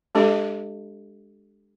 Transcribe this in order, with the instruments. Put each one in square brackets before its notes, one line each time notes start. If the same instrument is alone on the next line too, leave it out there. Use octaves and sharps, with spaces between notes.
[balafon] G#3 D4 G4 A4 D#5